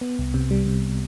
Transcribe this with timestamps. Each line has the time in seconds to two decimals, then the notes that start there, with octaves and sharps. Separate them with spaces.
0.01 B3
0.19 C2
0.34 C3
0.51 G3
0.66 C3